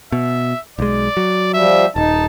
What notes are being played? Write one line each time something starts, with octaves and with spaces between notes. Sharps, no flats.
B2 E5
B1 G#3 D5
F#3
F3 G3 E5
D#1 D#4 A5